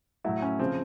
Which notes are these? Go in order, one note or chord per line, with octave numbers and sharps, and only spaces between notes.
A2 F#3 A3 E4 F#4
C#4
C#3 F3 C4